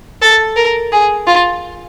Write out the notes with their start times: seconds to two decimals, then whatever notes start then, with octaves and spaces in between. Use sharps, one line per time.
0.22 A4
0.56 A#4
0.92 G#4
1.27 F4